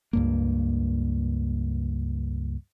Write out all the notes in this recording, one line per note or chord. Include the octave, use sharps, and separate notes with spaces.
C#2 G2 A#3